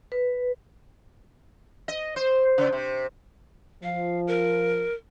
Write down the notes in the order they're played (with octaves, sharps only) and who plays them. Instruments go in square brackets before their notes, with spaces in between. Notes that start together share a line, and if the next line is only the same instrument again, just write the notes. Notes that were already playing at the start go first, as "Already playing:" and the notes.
[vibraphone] B4
[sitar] D#5
C5
C#3
C3
[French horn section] F3 [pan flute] F5
[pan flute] A#4